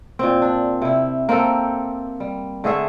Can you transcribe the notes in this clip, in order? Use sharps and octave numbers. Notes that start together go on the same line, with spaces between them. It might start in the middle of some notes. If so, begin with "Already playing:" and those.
A#2 C4
D4
C3 E4
A#3 C4 G4 A4
G3
D3 A3 G#4 E5